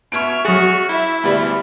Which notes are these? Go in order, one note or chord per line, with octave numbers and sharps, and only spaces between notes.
B2 E5 C#6 F6 G#6 D7
F#3 F#4 G#4 C#6 A6
E4 E5
D2 B2 G3 E5 B5